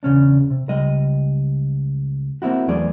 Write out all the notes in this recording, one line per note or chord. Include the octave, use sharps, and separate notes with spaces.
E2 C#3 C#4 D4
C3
C#2 G3 D#5
A#3 C4 D#4 E4 F#4
E2 F#3 A3 G#4 D5